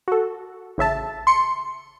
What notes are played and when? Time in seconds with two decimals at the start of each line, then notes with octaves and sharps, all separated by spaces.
0.08 F#4 A4
0.78 A1 C#3 E5 A5
1.27 C6 C#7